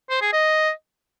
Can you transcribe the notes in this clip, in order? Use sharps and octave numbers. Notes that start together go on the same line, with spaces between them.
C5
G#4
D#5